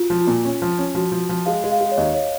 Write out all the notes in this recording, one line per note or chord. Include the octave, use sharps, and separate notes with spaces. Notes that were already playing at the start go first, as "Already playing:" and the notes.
Already playing: F4 F#4
F3
F4
A#2
C#4
F3
C#4
F3 F#4
F3
F3
G#3 F5
G#3
F5
G#3
C#5
D#2 D#5
C#5